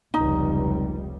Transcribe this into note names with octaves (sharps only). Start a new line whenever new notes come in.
F1 C#2 G3 D#4